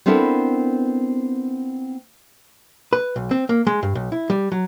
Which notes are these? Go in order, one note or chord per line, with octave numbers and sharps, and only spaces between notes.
B3 C4 D4 E4 A4 A#4
B4
B1
C4
A#3
G#3
G2
B1
E4
G3
F#3